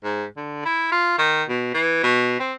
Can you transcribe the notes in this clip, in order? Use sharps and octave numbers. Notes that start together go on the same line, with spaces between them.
G#2
D3
E4
F4
D#3
B2
E3
B2
C4